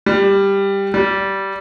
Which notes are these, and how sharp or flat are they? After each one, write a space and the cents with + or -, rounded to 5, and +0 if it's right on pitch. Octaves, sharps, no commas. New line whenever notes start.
G3 +10
G3 -15